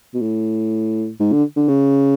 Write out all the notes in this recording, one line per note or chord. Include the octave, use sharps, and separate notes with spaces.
B2
A2
G#2
D3
D3
C#3